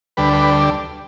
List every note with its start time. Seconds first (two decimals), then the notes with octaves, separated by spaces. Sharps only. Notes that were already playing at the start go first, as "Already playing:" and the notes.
0.17 D2 D3 G3 B4
0.33 B4